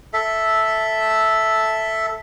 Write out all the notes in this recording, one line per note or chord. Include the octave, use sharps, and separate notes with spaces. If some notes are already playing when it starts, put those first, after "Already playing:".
A4 E5